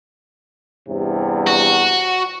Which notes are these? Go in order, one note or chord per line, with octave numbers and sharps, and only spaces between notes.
E2 G2 C3
F#4